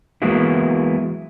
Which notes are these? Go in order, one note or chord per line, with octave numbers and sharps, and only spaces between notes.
E3 F#3 G#3 A#3 B3 E4